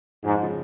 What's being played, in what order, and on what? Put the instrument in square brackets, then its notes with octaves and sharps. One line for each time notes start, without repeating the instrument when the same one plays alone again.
[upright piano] F2 [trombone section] G#2
[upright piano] C#3 F3 G#3